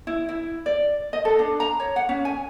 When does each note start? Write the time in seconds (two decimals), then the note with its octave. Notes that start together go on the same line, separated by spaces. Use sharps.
0.07 E4
0.29 E4
0.66 D5
1.13 D#5
1.25 A4
1.39 D4
1.60 A#5
1.80 C#5
1.96 F#5
2.09 C#4
2.25 G#5